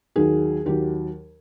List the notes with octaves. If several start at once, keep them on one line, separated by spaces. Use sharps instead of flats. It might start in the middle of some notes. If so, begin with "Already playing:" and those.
D#2 D#3 F#3 G#4
D#2 D#3 F#3 G4